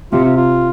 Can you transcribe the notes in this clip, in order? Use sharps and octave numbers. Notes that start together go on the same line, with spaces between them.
C3 F4
F4
F4